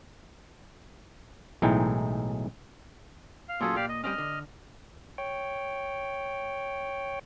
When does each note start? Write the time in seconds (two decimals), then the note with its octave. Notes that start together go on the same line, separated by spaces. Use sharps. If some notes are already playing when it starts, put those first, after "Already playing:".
1.62 B1 A2 E3 G#3 D#4 G5
3.49 F5
3.61 A#2 F#3 C#4 F4 G#4 A4
3.76 A#2 G4 D5 F5
3.89 D#5
4.04 G3 C4 C#4 D#5 F6
4.18 D3
5.18 C#5 G5